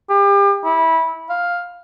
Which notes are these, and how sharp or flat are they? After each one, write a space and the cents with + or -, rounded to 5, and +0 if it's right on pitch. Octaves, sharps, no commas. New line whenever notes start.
G4 +35
E4 -20
F5 +5